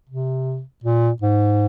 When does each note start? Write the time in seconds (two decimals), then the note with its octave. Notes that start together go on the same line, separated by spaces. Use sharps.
0.09 C3
0.84 A#2
1.22 G#2